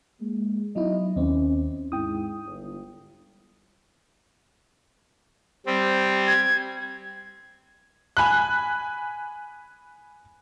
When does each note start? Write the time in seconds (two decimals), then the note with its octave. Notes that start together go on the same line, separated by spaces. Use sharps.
0.20 G#3 A#3
0.76 F#3 B3 D#4 E4 D#5
1.16 D#2 C4 C#4
1.92 G#2 E4 G5 D#6
2.46 G1
5.66 G3 C4
6.27 G#6
8.17 G#5 B5 F#6